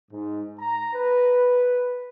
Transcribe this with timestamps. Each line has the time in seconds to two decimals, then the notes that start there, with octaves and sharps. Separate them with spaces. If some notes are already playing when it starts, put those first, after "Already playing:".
0.11 G#2
0.59 A#5
0.93 B4